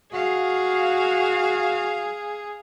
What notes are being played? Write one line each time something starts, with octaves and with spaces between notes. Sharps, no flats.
F#4 G#4 F5